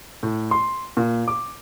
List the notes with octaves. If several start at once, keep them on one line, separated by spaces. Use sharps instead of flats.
A2
C6
A#2
D6